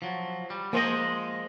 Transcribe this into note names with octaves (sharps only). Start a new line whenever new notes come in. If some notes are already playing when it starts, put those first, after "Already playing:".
F3 F#3
G3
F3 G#3 A#3 C5 D#5